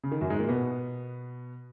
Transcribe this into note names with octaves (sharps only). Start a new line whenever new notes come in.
C#3
D#3
F#2 F#3
G#2 G#3
A#2 A#3
B2 B3